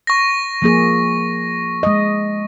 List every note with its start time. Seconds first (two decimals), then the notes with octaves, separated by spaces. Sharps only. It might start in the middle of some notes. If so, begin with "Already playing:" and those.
0.07 C#6 A#6
0.62 F3 A#3 G#4
1.83 G#3 D#5